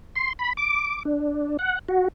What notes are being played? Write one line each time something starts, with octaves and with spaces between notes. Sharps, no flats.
C6
B5
D6
D4
F#5
F#4